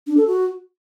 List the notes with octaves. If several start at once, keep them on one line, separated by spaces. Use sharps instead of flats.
D4
A4
F#4